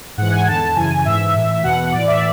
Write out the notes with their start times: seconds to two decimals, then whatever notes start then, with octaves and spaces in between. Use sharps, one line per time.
0.17 G#2 E3 F#5
0.32 G#5
0.47 E2 D3 A5
0.76 F#2 C#3 E3 G#5
1.05 G#2 E3 E5
1.34 A2 E3
1.63 E2 B2 F#5
1.92 A2 E3 D5
2.07 E5